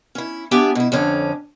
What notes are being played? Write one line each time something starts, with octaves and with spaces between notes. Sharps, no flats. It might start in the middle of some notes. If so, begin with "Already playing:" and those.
C#4 E4
B3 D4 G4 E5 G#5
B2 E4
F2 D3 C#4